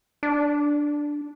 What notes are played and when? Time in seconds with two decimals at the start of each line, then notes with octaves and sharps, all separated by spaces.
0.23 D4